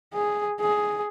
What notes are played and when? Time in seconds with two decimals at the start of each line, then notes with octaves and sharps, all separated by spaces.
0.14 G#4
0.60 G#4